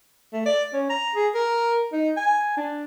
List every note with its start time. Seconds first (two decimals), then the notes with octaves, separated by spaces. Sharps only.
0.32 A3
0.46 D5
0.73 C#4
0.89 A#5
1.15 G#4
1.34 A#4
1.92 D#4
2.17 G#5
2.57 D4